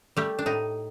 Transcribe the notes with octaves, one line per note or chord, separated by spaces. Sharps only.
G3 A3 G4
D4
A2 D#4